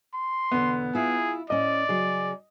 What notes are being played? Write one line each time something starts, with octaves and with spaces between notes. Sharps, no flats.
C6
E2 B2 D3 B3
E4 F4 G#4
A2 C#4 D5 D#5
C#3 F#3 G#4